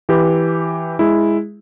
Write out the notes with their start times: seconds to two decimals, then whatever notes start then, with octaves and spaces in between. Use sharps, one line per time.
0.09 E3 G4 B4
0.99 G#3 E4